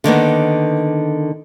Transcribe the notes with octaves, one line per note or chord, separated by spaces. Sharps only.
D3 D#3 A#3 B3